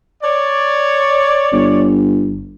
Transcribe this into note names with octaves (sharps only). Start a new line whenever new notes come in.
C#5 D5
G1